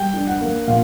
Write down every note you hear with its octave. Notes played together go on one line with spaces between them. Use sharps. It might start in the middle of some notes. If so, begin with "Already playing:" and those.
Already playing: G3 G5
D4
F#5
A#3
A#2 F5